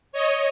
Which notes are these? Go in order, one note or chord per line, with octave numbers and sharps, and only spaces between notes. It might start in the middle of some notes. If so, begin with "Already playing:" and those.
C#5 D#5